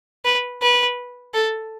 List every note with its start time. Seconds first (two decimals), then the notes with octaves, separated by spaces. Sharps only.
0.25 B4
0.62 B4
1.34 A4